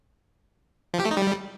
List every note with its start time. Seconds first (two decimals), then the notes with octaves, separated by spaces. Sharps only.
0.94 F3
1.00 G4
1.05 A3
1.11 D#4
1.17 G3